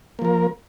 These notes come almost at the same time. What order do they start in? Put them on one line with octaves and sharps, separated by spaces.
A#3 F3 A#4